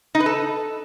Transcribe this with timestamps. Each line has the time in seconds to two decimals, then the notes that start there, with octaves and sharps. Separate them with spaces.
0.15 D#4
0.20 B4
0.26 A4